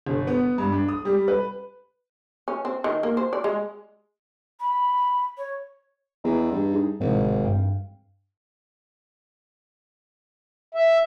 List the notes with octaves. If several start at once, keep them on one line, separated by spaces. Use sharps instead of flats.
G1
B3
G2
D4
D#6
G3
B4
C#4
C4
D#3
A#3
C5
D5
G#3
B5
C#5
E2 D#5 A#5 E6
G2
D#4 G#4
G#1 A2 C3 E3
G2 F5 G5
E5